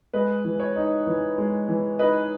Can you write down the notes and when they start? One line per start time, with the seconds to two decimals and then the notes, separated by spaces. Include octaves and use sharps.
0.13 G#3 B4 D#5
0.45 E3
0.60 C#5
0.76 D#4
1.07 E3
1.38 G#3
1.69 E3
1.99 D#4 B4 D#5